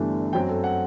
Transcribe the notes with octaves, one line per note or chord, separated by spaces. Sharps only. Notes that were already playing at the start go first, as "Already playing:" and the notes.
Already playing: G1 G2 E3 A3 D4
F#2 F#3 C4 G5
A4
F#5